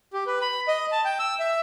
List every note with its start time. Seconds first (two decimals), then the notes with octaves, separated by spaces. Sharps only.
0.13 G4
0.27 B4
0.41 B5
0.68 D#5
0.92 A5
1.05 G5
1.19 E6
1.40 E5